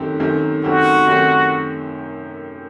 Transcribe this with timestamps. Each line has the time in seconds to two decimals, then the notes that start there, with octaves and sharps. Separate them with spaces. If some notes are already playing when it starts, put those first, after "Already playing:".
Already playing: F#2 D#3 A3 C4 G4
0.20 F#2 D#3 A3 C4 G4
0.64 F#2 D#3 A3 C4 F#4 G4
1.07 F#2 D#3 A3 C4 G4